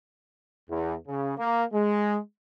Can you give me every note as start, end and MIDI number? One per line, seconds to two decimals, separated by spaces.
0.69 0.94 40
1.07 1.33 49
1.38 1.63 58
1.73 2.18 56